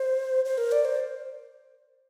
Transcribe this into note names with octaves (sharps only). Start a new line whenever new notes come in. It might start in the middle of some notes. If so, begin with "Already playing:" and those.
Already playing: C5
C5
A#4
D5
C5